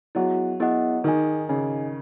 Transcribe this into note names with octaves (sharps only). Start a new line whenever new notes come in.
F#3 B3 E4 G#4 D#5 F#5
B3 E4 G#4 D#5 F#5
D#3 D#4 G#4 D#5 G#5
C#3 D#4 G#4 D#5 G#5